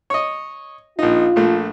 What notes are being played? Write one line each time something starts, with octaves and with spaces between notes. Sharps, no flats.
C#5 D#5
A#1 D#4 F4
A#1 A3